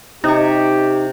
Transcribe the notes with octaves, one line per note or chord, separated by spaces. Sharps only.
C3 D#4 G4 C#6